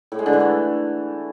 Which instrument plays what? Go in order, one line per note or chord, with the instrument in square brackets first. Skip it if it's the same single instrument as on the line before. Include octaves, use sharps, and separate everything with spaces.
[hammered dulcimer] A2
G#3
D3
E3
A3